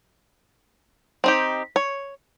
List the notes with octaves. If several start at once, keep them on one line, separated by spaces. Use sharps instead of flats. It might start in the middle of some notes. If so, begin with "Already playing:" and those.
C4 D#4 G4
C#5